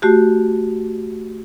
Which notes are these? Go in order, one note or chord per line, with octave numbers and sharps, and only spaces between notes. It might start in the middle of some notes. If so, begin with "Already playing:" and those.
A3 F#4 G4